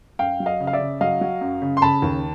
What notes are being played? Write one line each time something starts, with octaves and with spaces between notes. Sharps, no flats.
F#2 F5 G5
F#3
D#5 F5
C#3
F5
D5 E5
C#3
F#3 D#5 F5
F#3
F#2
C#3
C6
C#3 A5 B5
D#2